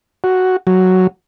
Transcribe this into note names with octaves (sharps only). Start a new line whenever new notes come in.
F#4
F#3